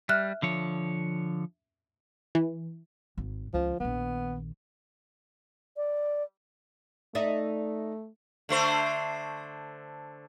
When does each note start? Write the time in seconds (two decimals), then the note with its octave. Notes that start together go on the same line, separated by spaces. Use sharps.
0.09 G3 E5 F6 F#6
0.42 D3 F3 C#5
2.35 E3
3.18 G#1
3.54 C#2 D3 F3
3.80 A#1 D#3 B3
5.77 D5
7.15 A3 D#4 D5 E5
8.49 D3 A3 C5